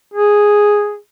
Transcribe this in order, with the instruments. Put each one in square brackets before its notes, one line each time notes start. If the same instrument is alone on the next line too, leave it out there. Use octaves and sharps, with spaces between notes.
[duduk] G#4